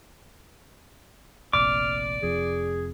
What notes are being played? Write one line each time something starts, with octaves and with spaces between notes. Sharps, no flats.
F1 A#1 F2 D5 D6 F6
F1 F2 G#4